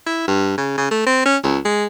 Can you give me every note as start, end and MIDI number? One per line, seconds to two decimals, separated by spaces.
0.06 0.24 64
0.27 0.54 43
0.57 0.77 49
0.77 0.90 49
0.91 1.03 57
1.06 1.22 60
1.25 1.37 61
1.44 1.59 37
1.65 1.86 56